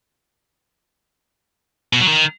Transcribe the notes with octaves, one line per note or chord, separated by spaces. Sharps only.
B2
F#3
D#3